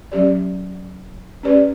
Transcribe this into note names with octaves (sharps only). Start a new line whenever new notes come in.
F#3 C#4 G4 D5
C#4 G4 B4 D5